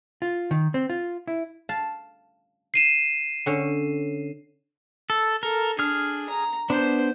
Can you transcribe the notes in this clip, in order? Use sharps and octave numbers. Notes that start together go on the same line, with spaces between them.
F4
D#3
C4
F4
E4
F5 A5
C7 D#7 E7
D3 C#4
A4
A4 A#4
D4 G#4 F6
A#5
B3 D4 C5